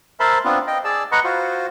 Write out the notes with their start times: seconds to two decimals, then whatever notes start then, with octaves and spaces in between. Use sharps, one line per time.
0.20 A#4 C5 E5 A5 B5 C6
0.45 B3 C4 D4 F4
0.67 D#5 G5
0.84 G#4 D5 A5 E6
1.12 B4 D#5 F#5 A#5 B5 C#6
1.24 F4 F#4 C5